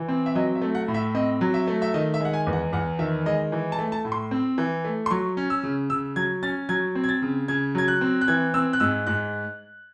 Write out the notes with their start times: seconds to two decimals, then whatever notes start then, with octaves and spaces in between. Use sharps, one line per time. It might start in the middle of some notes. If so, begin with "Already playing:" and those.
Already playing: E3
0.08 C4
0.26 E5
0.35 F#3 D#5
0.55 E5
0.61 A3
0.75 F#5
0.88 A2
0.94 E5
1.15 C4 D#5
1.41 F#3
1.54 E5
1.67 A3
1.82 E5
1.94 D#3 D#5
2.14 E5
2.20 G#3 F#5
2.33 G#5
2.47 E2
2.53 F#5
2.73 E2 F#5
2.99 D#3 E5
3.26 G#3 D#5
3.52 E3
3.72 A5
3.79 A3
3.92 A5
4.05 A2
4.12 C6
4.31 C4
4.58 E3
4.85 A3
5.06 C6
5.11 F#3 C#6
5.37 C#4
5.50 E6
5.63 C#3
5.90 C#3 E6
6.16 F#3 G#6
6.43 C#4 A6
6.69 F#3 G#6
6.95 C4
7.04 G#6
7.09 A6
7.22 C#3
7.48 C#3 G#6
7.75 F#3 G#6
7.88 F#6
8.01 C4
8.21 F#6
8.28 E3 G#6
8.54 C4 E6
8.73 F#6
8.80 G#2 E6
9.07 G#2 F#6